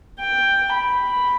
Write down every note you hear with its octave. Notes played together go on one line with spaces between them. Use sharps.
G5
B5